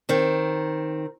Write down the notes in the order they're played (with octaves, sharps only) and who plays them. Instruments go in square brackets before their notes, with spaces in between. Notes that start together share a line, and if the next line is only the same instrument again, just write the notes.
[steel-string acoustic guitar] D#3 C4